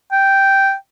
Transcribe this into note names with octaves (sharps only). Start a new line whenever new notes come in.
G5